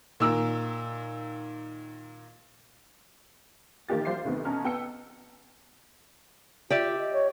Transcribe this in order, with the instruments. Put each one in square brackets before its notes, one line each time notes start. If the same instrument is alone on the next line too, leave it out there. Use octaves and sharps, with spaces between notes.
[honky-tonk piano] A#2 D#3 A#4 E6
A#1 D#3 A#3 G4 A6
F#3 C5 F5 D6 C7
D2 C3 D#3 B3
B2 C#4 A#5 F6
B3 G5 E6 C#7
[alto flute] F4 [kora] G4 D5 E5
[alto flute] D#5
[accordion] C#5